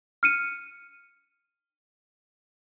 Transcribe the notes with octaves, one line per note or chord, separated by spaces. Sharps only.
F6 C#7 D#7